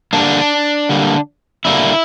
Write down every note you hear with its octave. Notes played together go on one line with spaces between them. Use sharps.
D3 G3 A#3 D4
D3 G3 A#3
D3 G3 A#3 E4